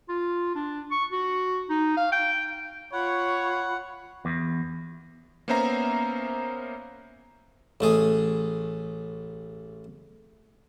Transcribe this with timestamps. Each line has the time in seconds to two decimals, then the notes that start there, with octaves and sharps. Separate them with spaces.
0.09 F4
0.55 D4
0.91 C#6
1.12 F#4
1.69 D#4
1.97 F5
2.12 G5
2.93 F4 C#5 F#5 B5 C#6
4.25 E2
5.48 A#3 B3 C#4 C5 E5 A#5
7.80 A1 A3 G#4